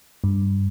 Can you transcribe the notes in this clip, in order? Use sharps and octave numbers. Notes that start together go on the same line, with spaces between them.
G2